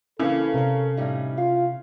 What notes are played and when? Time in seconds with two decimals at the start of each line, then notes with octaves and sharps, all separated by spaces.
0.20 C#3 E3 A#3 E4 A4
0.54 C3 C#4 A#4
0.97 A2 G3 D#4
1.38 F4 F5